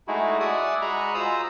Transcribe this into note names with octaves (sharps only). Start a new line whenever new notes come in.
G#3 A3 D#4 E4 F#4 G#4
D5 E5 F#5 G#5 D#6
G#3 F#4 G#4 A#5 B5 C#6
F4 C5 A#5 D#6 E6